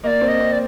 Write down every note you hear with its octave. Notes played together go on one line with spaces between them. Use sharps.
A#3 D5 D#5
C4
D#5
C4
D5